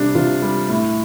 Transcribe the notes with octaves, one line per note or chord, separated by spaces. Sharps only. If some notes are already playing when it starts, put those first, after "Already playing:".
Already playing: C3 G3 D4
C3 F4
G3
A2